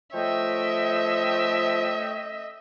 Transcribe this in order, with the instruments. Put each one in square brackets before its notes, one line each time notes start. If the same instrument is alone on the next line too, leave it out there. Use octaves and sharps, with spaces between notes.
[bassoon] F3 [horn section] A3 C#5 G5 [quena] D#5 [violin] E5